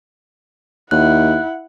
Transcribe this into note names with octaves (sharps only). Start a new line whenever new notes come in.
D#2 E4 F#5 F#6